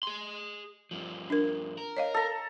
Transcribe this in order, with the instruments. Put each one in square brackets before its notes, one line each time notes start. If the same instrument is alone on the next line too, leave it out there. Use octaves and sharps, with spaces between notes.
[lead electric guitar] G#4 C6
G2 F3
[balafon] D4 A#4
[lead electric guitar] A#4
[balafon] C#5 D#5 F5
[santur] A4 A#5